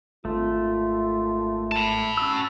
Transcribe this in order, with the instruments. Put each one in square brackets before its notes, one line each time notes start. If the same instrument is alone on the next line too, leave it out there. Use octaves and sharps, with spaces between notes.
[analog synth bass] G#1 [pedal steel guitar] A3 [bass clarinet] F4
[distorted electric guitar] A5 B5
[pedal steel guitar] C#4 F#4 E6